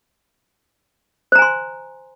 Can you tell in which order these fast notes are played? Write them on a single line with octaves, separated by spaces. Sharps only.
C5 A#5 G#5 C6